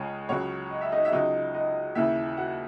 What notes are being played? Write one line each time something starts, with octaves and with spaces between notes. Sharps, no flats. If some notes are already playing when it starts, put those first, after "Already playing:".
Already playing: C#2 C#3 G#3 C#5 G#5
C#2 C#3 F#3 C#5
D#5
E5
D#4 D#5
E5
C#2 C#3 F#3 D#4 D#5
D#4 D#5
D#2 C#3 E3 E4 E5
F#4 F#5